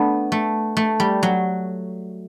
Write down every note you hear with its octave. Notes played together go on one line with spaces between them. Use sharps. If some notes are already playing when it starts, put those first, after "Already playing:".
Already playing: A3 B3 D4
A3
A3
G3
F#3